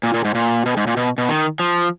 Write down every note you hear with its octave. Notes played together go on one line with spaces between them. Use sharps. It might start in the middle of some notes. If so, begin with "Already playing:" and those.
A#2
A#2
G#2
A#2
B2
G#2
A#2
B2
B2
D#3
F3